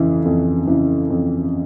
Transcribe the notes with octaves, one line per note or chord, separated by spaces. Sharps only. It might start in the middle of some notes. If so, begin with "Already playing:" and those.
Already playing: F2 C#3 E3
F2
C#3 E3
F2